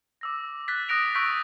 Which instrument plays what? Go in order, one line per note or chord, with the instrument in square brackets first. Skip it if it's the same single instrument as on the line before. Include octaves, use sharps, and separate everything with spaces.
[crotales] D6 E6 A#6
F#6 A6 B6
D#6 F#6 A#6 D7 F7
C#6 E6 G6 A#6 B6 D7